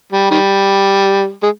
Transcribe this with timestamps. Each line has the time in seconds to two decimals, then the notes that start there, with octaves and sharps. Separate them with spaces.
0.12 G3
0.31 D#3 G3
1.43 G#3